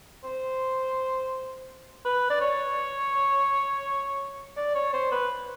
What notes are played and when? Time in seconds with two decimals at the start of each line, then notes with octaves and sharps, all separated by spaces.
0.24 C5
2.05 B4
2.30 D5
2.41 C#5
4.57 D5
4.75 C#5
4.93 C5
5.12 B4